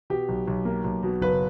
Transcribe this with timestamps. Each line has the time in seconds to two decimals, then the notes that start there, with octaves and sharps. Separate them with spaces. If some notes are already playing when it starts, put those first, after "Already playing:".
0.10 B2 G4
0.29 B1
0.47 B1
0.65 A#3
0.84 B1
1.03 B2
1.21 F#1 B4